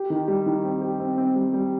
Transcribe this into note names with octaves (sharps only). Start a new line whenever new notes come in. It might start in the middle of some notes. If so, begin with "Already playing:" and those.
Already playing: G4
D#3
G3
D#3
C4
G4
C4
C4
G3
G3